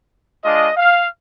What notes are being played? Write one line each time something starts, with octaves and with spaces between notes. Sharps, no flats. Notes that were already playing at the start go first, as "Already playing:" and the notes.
G#3 D4 F4 D#5
F5